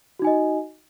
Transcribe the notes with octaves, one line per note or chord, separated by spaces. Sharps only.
D#4 F#4 D#5 G#5